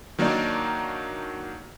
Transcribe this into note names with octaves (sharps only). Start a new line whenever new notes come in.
D#3 F#3 A#3 D4 D#4 D5